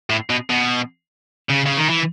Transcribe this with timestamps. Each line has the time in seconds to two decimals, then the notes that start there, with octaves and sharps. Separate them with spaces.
0.10 A2
0.30 B2
0.50 B2
1.50 C#3
1.66 C#3
1.78 D#3
1.90 E3